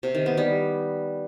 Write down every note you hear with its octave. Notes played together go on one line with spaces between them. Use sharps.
C3
D#3
B3
G3